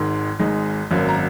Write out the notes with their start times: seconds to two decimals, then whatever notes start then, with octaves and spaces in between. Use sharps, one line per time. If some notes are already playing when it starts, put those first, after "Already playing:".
Already playing: G#1 G#2 D#3
0.39 G#1 G#2 G#3 D#4
0.91 G#1 F#2 F#3 A#3
1.08 A#5